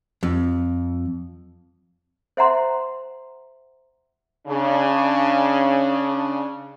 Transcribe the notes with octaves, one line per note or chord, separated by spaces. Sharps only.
F2
C5 E5 F#5 A#5 C6
C#3 D4